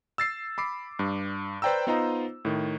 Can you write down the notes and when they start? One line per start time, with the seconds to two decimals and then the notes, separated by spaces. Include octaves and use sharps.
0.18 E6 A6 C7
0.58 B5 D6 C7
0.99 G2
1.62 B4 C5 D5 G5 A#5 E6
1.87 B3 D#4 F4 C5 D#5 A#5
2.45 A2 D#3